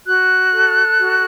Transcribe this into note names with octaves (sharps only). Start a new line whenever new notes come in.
F#4 F#6
A4
F#4